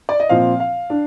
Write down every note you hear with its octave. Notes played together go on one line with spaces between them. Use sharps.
D5
D#5
A#2 F3 C4 F5
F5
D4